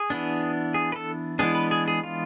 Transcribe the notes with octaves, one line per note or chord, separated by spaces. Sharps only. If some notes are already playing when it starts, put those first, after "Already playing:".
Already playing: G#4
E3 B3 D4
G#4
B4
A4
E3 G#3 B3 D4 G#4
B4
G#4
G#4
F4